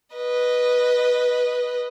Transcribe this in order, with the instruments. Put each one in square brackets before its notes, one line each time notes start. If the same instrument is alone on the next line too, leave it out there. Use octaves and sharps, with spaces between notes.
[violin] B4 D#5